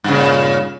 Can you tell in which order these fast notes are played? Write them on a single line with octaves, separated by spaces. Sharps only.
G2 C#3 A#2